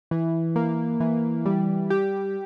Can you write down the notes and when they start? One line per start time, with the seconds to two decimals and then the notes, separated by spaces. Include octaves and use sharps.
0.11 E3
0.56 A#3
1.00 E3
1.45 G3
1.90 G4